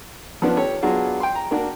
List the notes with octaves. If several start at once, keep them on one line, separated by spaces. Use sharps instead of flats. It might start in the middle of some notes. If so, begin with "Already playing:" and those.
F3 B3 C#4 D4 F4 B4
G4 A4 C#5
F#3 B3 D4 F4 F#4 G#4
G5 C6
A#5
A#3 D4 F#4 A#4